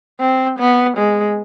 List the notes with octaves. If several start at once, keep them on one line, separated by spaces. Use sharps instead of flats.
C4
B3
G#3